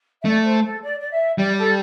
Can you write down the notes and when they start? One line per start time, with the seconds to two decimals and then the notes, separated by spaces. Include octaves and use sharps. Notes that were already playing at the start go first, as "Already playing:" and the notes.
0.22 E5
0.25 A3 D5
0.44 C5
0.64 A4
0.82 D5
0.99 D5
1.11 E5
1.38 G3 D5
1.57 A4